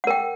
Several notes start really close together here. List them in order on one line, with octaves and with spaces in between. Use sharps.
F#5 A#4 G5